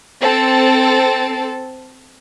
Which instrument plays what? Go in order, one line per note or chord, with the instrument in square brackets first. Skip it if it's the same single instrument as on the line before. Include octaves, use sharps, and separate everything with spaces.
[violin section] C4 A4